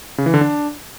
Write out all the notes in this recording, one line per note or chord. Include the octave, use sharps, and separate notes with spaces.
C#3
E3
D3
D4